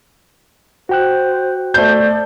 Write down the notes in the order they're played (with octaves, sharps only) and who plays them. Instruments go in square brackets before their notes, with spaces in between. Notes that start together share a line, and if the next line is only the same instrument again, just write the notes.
[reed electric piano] F#4 G5 F#6 [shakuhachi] C5
[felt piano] A3 C5 [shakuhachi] D5 [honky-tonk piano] G6